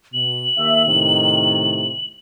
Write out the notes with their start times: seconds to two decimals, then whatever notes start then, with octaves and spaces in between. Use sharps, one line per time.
0.14 B2 F#7
0.57 D#2 E5
0.86 A2 C3 D#3